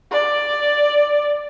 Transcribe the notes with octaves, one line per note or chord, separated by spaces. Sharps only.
D5